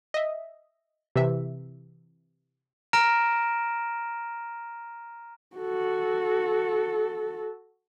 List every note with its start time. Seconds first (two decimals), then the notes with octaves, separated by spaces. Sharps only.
0.14 D#5 E5
1.16 C3 E3 E5
2.93 A#5 F6 A#6 D7 E7
5.57 F#4 A4